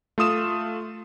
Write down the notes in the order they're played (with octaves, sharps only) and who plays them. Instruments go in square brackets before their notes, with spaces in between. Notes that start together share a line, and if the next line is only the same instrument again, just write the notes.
[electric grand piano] A3 F4 D#6 E7